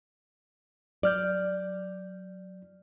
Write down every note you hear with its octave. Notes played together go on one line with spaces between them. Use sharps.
F#3 D5 F6 G6